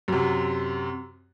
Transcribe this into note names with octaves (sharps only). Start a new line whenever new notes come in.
F#2 C3